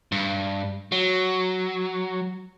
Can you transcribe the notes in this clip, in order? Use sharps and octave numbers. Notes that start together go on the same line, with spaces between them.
G2
F#3